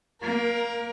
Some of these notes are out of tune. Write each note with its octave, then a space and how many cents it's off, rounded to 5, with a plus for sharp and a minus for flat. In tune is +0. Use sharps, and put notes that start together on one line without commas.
A#3 +0 A#4 +25